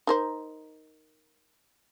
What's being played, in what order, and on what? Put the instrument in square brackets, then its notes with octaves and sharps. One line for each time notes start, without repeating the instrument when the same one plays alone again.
[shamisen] D#4 A#4 C5